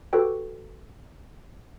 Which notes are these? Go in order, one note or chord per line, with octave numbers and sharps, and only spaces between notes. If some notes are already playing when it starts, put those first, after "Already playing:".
F#4 G4 A4 B4 G5